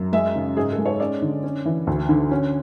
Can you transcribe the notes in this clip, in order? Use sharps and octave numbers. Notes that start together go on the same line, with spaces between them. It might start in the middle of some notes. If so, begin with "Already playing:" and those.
Already playing: F#2
G#3 E5
C#3
G#2 G#4
A4
G#3
C#5
C#4 D5
D3
C#4
E3
D2
D3
C#4